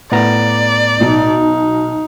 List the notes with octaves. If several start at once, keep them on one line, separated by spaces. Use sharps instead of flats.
A2 B3 D5 A#5
B1 D#4